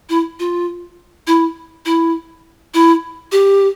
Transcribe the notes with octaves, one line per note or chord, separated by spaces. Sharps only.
E4
F4
E4
E4
E4
G4